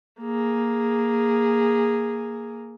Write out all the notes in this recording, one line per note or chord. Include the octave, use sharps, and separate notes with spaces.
A#3 G#4